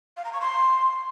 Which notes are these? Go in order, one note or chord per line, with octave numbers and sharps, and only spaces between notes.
F5
A#5
C#6
C6